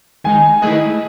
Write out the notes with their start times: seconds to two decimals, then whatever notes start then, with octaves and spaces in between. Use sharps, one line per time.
0.24 D#3 G#3 D#4 G#5
0.62 D#3 A3 E4 G#4 B4 D#5